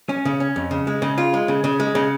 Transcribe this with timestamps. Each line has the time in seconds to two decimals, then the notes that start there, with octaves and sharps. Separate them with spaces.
0.09 C#4
0.25 C#3
0.40 C#4
0.56 F2
0.71 C#3
0.87 G#3
1.02 C#3
1.18 F4
1.34 G#3
1.48 C#3
1.64 C#3
1.80 G#3
1.95 C#3